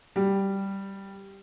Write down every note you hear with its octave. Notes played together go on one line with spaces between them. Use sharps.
G3